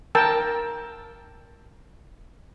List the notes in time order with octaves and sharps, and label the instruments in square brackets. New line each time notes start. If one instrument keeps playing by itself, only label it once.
[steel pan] A#4 G5 A5 E6